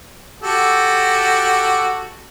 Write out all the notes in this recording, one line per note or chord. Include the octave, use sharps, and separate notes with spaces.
F#4 G4 A4